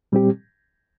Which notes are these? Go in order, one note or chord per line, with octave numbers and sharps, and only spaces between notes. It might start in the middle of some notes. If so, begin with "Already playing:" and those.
A#2 G3 C4 G4